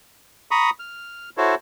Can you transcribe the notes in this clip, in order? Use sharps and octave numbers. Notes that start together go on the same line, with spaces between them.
A#5 B5 C#6 D#6
F6
E4 F#4 A4 C5 C#5